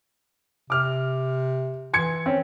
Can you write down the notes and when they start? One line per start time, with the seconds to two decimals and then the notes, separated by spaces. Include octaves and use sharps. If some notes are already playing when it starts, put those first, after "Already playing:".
0.70 C3 D6 F6
1.93 E3 C6 G#6 C#7
2.26 C4 C#4